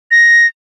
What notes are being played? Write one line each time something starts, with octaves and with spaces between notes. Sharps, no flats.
A#6